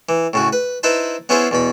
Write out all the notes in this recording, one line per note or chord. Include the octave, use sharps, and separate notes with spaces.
E3
A2 C#3 F#4
B4
D#4 E4 B4 C5 A5
B3 C#4 E4 F4 G#4 C5
E2 B2 B5